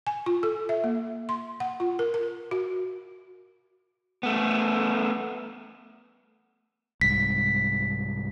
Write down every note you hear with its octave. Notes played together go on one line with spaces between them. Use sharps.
G#5
F4
A4
E5
A#3
C6
F#5
F4
A#4
A#4
F#4
A3 B3
C2 G#2 B6